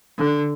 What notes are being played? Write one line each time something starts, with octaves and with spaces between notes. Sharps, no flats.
D3